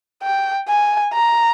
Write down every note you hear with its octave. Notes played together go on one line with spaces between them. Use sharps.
G5
G#5
A#5